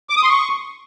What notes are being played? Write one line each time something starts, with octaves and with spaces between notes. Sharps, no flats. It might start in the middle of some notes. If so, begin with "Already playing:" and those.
D6
D#6
C6
C#6